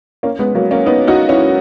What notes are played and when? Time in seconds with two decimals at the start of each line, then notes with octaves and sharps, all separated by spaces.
0.23 A#3 C#4
0.39 G#3 B3
0.55 F#3 A#3
0.71 A#3 C#4
0.86 B3 D#4
1.08 D#4 F#4
1.29 C#4 E4